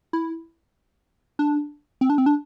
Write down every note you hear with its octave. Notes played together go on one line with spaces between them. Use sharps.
E4
D4
C4
D4
C4
D4